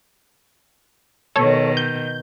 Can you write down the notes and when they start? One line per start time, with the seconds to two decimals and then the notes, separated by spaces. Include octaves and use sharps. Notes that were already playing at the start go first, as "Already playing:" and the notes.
1.36 B2 D#3 A4 C#5
1.77 G6